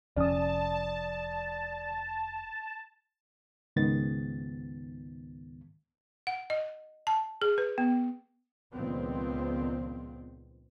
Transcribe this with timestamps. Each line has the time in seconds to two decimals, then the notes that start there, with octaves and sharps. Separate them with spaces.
0.17 F1 F2 C#4 D5 A5 D#6
3.76 C#2 G#2 D#3 B3 A6
6.27 F#5
6.50 D#5
7.07 A5
7.42 G#4
7.58 B4
7.78 B3
8.73 C#2 A#2 D#3 F3 B3 C4